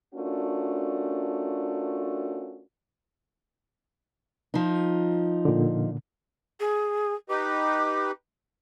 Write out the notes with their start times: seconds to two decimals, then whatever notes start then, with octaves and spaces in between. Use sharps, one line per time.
0.14 A3 C#4 D4 F4 F#4 A#4
4.54 F3 D#4
5.45 A#2 D3
6.60 G#4
7.30 D#4 G4 B4 D6